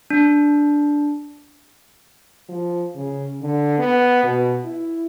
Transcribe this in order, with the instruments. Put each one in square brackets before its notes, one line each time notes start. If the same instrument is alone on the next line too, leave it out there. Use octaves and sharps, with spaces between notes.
[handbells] D4
[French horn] F3
C#3
D3
B3
B2
E4